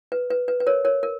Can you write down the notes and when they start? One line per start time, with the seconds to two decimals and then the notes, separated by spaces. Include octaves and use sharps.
0.12 B4
0.30 B4
0.48 B4
0.60 B4
0.67 A#4 C#5
0.85 A#4 C#5
1.03 A#4